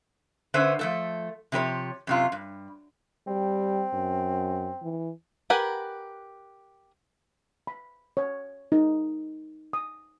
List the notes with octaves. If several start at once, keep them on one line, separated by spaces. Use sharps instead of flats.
D3 C#4 B4 C5 E5
F3 A3 A4
C3 F3 G4 A#4 C#5
F#2 C3 F4
G2
G3 C4
F#2
E3
G4 A#4 B4 F#5 G#5
B5
C#5
D#4
D#6